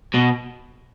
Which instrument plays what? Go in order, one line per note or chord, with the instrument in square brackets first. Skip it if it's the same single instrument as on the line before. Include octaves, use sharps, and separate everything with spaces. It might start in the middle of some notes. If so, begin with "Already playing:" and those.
[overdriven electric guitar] B2